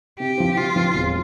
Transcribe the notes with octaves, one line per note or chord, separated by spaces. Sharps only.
C3 G4
F3 C4
C3 F4
F3 C4
E1